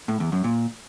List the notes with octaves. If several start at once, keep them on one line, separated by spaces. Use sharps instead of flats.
A2
E2
F#2
A#2